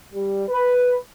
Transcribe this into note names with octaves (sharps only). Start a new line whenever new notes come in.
G3
B4